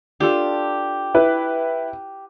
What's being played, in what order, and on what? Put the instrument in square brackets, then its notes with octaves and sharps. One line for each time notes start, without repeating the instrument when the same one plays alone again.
[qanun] D4 F4 A4 [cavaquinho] G4
[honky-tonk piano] E4 B4